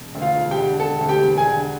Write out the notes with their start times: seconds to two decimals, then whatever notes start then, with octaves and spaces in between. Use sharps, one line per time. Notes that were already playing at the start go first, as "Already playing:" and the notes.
Already playing: E1
0.15 D2
0.22 F4 F5
0.37 E1
0.51 G4 G5
0.58 D3
0.79 E1 A4 A5
1.01 D2
1.09 G4 G5
1.23 E1
1.37 G#4 G#5
1.45 D3